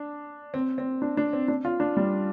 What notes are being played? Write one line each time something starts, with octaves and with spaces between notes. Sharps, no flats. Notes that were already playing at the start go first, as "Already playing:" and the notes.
Already playing: D4
C4
C4
D4
D4
C4
D4
F4
D4
G3